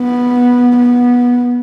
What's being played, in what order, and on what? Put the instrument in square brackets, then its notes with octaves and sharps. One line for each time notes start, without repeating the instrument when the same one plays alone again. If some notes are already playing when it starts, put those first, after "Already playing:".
Already playing: [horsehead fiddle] B3
B3